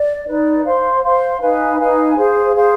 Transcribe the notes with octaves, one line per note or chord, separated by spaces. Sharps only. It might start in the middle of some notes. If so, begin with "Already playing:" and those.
Already playing: D5
D#4 B4 D5
C5 F5 C6
C5 F5 C6
D#4 B4 F5 G#5
D#4 B4 F5 G#5
G#4 C5 F5
G#4 C5 F5